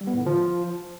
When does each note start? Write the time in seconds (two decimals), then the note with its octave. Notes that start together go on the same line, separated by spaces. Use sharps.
0.01 G3
0.07 B3
0.14 A2
0.20 D3
0.26 F3